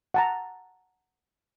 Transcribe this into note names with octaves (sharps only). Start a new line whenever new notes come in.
F#5 A5 A#5